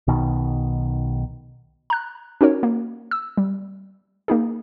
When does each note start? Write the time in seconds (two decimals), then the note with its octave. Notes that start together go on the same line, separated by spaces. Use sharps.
0.07 B1 B2 D#3
1.90 A#5 F#6
2.41 C#4 D#4 F#4 A#4 C#5
2.63 A#3
3.11 E6
3.37 G3
4.28 A#3 D#4 G#4